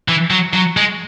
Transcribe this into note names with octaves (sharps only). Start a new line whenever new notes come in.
E3
F#3
F#3
G#3